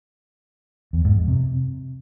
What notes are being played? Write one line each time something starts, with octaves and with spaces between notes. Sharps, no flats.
E2
G#2
F2
C3